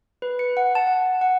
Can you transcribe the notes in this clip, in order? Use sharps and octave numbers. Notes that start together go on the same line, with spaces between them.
B4
C#7
F#5
A5
F#5
F#5